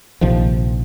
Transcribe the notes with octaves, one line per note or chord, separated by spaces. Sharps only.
A#1 C3 D#3 F3